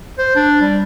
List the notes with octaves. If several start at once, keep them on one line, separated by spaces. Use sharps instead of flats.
C5
D4
G3